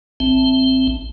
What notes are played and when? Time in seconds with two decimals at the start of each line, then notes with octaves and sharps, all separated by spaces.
0.20 A1 C4